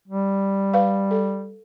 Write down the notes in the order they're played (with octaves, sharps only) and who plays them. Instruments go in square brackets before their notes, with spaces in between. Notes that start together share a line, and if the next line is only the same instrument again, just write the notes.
[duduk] G3
[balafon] B4 F5
A4